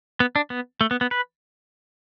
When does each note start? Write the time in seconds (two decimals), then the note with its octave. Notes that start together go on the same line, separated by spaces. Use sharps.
0.20 B3
0.36 D4
0.50 B3
0.81 A3
0.91 B3
1.01 B3
1.11 B4